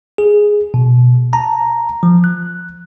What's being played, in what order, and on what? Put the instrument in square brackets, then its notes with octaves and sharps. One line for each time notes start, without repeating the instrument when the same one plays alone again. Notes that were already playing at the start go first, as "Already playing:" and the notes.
[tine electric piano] G#4
B2
A5 A#5
F3
F#6